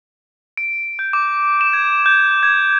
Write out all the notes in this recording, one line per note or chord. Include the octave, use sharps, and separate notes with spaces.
D7
G6
D6
E7
G#6
G6
G#6